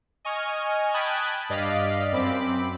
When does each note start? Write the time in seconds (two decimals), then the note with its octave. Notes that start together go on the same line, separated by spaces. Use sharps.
0.25 D#5 G#5 C#6 F6
0.94 G5 A5 B5 D#6 F#6 G#6
1.49 G2 D5 D#5 F5 B6
2.12 F#2 C4 B5 D6